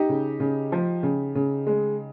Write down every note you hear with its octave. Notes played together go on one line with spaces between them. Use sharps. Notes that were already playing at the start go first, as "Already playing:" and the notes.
Already playing: D#4 G4
C#3
C#3
F3
C#3
C#3
G#3